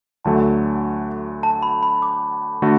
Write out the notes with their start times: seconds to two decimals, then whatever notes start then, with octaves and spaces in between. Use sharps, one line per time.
0.25 D2 D3 F#3 A3 A5
1.43 A5
1.63 B5
1.83 B5
2.02 D6
2.62 D3 A3 F#4